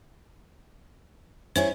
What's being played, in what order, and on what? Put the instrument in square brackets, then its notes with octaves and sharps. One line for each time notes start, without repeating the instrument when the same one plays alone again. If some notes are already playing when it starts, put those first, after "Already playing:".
[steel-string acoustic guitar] C#4 E4 C#5 [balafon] C5 G#5